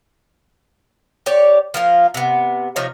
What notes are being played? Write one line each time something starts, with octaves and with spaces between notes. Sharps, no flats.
G4 C#5 D5
F3 A#3 F4
C3 B3
C3 F3 D#4 C#5